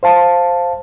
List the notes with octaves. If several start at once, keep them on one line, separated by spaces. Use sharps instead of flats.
C5 F5 A5